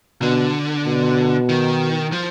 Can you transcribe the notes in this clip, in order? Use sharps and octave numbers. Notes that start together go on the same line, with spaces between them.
B2 D3
B2
D#3
F3